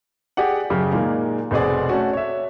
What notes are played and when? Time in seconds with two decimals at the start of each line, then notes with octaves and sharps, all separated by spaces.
0.37 G4 G#4 D5 F#5
0.70 F#2 C#3 G4
0.92 A#2 D#3 G#3 A#3
1.51 F1 B2 C4 G#4 D5
1.89 A3 C#4 F#4
2.13 C#5 E5